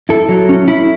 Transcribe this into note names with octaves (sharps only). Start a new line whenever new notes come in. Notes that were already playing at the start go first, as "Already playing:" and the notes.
E4 A4
F#3
C#4
E4